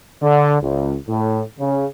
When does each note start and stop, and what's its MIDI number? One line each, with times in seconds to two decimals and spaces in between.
0.22 0.58 50
0.62 0.96 37
1.07 1.41 45
1.59 1.86 49